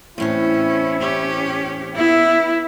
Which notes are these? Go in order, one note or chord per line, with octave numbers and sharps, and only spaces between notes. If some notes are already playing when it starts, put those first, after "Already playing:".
E2 A2 C4 C#4 E4
C#4 G4
B3 E4 E5